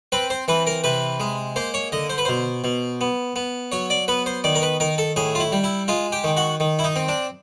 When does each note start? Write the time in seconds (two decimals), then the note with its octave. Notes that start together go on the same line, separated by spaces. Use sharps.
0.12 C4 B4
0.30 C5
0.48 E3 B4
0.67 A#4
0.84 C3 B4
1.20 G#3
1.56 A#3 C5
1.74 C#5
1.92 D3 D#5
2.10 C5
2.18 B4
2.25 B2 C5
2.64 B2
3.01 B3
3.36 B3
3.72 F#3 C#5
3.90 D5
4.08 B3 B4
4.26 C5
4.44 D#3 D5
4.55 A#4
4.62 B4
4.80 D#3 A#4
4.98 A4
5.16 A2 G#4
5.35 F4
5.40 E4
5.52 G3
5.64 E4
5.88 G#3 F4
6.12 G4
6.24 D#3
6.37 F#4
6.60 D#3
6.79 E4
6.84 D#4
6.96 C4
7.08 D4